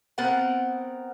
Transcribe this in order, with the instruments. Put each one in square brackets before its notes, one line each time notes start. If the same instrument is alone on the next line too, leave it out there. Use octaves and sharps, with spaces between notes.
[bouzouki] B3 C4 A#4 F#5